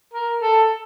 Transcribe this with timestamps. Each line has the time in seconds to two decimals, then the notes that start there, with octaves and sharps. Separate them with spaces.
0.14 A#4
0.42 A4